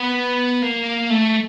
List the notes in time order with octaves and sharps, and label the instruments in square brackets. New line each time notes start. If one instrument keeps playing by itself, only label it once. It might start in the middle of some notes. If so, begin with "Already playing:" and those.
Already playing: [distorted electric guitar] B3
A#3
A3